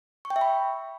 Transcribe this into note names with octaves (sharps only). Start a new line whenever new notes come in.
C#6
G5
E5
B5